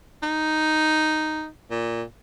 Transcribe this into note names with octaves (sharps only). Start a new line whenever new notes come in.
D#4
A#2